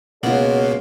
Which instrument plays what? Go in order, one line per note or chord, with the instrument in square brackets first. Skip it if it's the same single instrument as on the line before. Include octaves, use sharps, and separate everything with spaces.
[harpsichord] C#2 [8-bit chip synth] B2 A#3 [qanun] F4 F#5 [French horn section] F#4 G#4 C#5